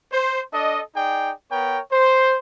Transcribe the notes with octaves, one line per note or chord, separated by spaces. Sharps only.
C5
D4 A4 D#5
D#4 G#4 D5 G5
B3 A#4 C#5 G5
C5